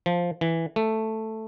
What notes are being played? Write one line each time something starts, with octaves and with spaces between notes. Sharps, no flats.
F3
E3
A3